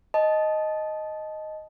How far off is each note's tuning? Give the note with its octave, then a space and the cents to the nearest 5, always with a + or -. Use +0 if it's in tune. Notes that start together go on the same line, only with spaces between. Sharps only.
D#5 +0 A5 -20